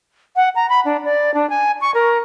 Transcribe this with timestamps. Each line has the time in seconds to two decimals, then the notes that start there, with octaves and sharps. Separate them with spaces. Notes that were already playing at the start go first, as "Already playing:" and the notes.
0.36 F#5
0.55 A#5
0.69 B5
0.85 D4
1.05 D5
1.34 D4
1.50 G#5
1.81 C#6
1.94 A#4